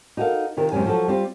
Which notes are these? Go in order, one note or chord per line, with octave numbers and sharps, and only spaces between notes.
D#4 F#4 A4 A#4 F5
C3 D#3 F4 A#4
F#2 C3 G#3 C#4 G#5
F3 F#3 F#4 A4
G3 C4 F4